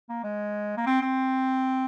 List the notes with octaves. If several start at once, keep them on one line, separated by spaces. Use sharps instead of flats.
A#3
G#3
A#3
C4
C4